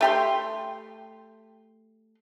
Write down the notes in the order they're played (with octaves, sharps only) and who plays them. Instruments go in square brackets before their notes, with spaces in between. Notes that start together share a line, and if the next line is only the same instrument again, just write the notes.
[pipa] A3 G4 C6